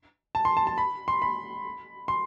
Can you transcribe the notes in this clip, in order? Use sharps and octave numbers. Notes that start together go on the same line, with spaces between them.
A5
C6
A5
A5
B5
C6
B5
C6